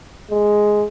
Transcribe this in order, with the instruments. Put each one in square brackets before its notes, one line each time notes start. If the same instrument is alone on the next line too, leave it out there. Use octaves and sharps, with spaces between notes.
[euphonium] G#3